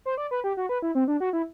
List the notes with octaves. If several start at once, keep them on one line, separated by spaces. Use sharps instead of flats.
C5
D5
B4
G4
F#4
B4
E4
C4
D4
F#4
E4